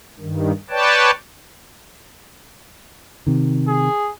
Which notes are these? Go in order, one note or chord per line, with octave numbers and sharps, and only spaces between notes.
G2 D#3
B4 C#5 D5 G5 A5
C3 D#3
G#4